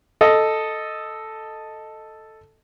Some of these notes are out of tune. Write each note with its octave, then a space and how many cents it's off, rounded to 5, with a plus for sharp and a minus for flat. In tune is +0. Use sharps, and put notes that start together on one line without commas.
A4 +0 D#5 +0